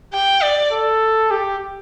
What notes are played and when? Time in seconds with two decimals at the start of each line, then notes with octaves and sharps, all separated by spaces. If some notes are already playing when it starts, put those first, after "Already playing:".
0.13 G4 G5
0.42 D5
0.71 A4
1.31 G4